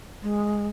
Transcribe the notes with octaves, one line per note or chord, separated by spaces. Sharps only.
G#3